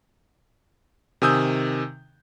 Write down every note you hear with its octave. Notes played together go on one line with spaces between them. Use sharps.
C3 D#3 G#5 D#6 E6 G6